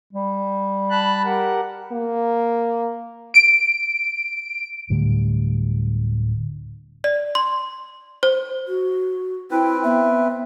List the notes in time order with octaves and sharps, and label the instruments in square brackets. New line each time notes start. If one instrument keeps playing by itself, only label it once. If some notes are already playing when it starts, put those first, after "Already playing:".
[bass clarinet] G3
[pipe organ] A5 B5 F#6
G4 A#4 F#5
[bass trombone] A#3
[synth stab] D7
[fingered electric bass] D1 D2 A2 G3
[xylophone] D5
C6
C5
[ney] F#4
[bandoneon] C4 B4 [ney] E4 [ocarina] G5
[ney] B3 [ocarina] E5